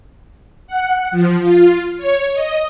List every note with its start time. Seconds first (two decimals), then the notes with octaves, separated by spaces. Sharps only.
0.67 F#5
1.11 F3
1.40 F4
1.97 C#5
2.33 D#5